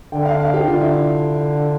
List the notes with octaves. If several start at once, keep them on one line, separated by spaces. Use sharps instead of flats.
D3 G5
F5
F5
G4
D3 F4
E4